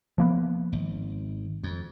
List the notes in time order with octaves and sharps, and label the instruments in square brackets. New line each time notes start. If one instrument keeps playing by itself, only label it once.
[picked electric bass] F3 A#3 B3
[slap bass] G#1
F2